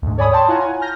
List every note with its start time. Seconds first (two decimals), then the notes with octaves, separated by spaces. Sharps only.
0.02 D2 G#2
0.17 A4 C#5 D5 G#5 B5 D#6
0.32 C#5 G5 A5 C6
0.48 E4 F4 C#5 F#5 G#5 A#5
0.60 G#5
0.81 F6 G6 A#6